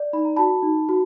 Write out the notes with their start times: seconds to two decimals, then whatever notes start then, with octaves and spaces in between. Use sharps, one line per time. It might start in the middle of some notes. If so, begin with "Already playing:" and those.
Already playing: D5
0.13 D#4 B5
0.25 A#5
0.36 F#4 A5 B5
0.63 D#4
0.89 F#4